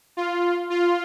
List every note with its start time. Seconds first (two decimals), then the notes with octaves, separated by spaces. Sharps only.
0.17 F4
0.70 F4